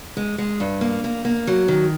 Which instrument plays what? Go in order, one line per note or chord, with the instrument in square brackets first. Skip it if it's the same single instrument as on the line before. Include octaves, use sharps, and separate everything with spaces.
[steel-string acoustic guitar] G#3
G#3
G2
A#3
A#3
A#3
F#3
D#3